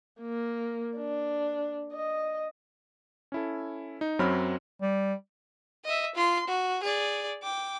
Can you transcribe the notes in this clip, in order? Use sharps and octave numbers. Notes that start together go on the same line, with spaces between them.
A#3
D4
D#5
C#4 E4 A4
D#4
F#2 F#3 C4 C#5 B5 F6
G3
D#5 E5
F4 C6
F#4
G#4 D5
G5 D6